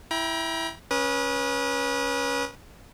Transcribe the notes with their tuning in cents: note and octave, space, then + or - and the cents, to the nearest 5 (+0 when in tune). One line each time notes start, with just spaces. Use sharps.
E4 +0 G5 +0 A#5 +40
C#4 +0 B4 -30 D#6 +0